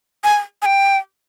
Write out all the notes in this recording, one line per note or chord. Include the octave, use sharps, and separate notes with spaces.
G#5
G#5
G5